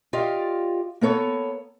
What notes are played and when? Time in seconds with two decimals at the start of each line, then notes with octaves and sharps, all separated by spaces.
0.13 F4 G4 D5 D#5 F5
1.01 A#3 B3 A4 C#5